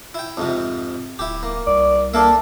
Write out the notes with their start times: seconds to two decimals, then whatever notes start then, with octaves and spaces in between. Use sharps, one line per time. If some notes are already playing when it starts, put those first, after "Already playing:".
0.15 E4 G5
0.37 F2 G#2 C3
1.19 D1 E4 G4
1.43 A#3
1.67 C2 D5
2.14 A#3 D4 A4 E5